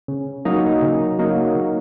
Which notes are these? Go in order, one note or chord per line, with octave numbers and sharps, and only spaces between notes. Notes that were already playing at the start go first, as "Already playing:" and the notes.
C#3
F#3 A#3 D#4
C#3
F#3 A#3 D#4
C#3